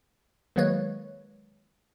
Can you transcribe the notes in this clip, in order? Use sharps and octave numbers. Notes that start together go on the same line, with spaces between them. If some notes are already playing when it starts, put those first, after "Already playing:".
D#3 F#3 G#3 A#3 B4 C#5